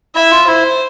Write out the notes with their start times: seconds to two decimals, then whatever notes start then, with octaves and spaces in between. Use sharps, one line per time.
0.15 E4 E5
0.31 F4
0.47 E4 C5